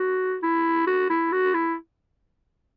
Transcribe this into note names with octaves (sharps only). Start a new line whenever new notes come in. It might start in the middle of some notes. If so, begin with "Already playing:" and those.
Already playing: F#4
E4
F#4
E4
F#4
E4